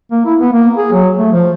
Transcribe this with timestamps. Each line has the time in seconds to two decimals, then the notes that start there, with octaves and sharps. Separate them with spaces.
0.11 A#3
0.26 E4
0.40 B3
0.53 A#3
0.77 G#4
0.92 F#3
1.17 A3
1.32 F3